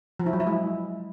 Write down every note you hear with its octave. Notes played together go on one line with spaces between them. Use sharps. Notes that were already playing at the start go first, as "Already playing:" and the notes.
F3
E4
F#3
E4
G#3